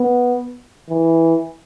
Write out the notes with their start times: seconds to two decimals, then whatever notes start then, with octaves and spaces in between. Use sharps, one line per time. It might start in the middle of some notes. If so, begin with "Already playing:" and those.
Already playing: B3
0.90 E3